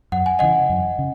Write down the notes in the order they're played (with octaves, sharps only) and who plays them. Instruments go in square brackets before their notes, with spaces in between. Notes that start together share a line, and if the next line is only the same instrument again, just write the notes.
[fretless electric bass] F#2 [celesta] F#5
[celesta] G#5
[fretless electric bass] C#3 E3 [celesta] D#5 F#5
[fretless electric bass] F#2
C#3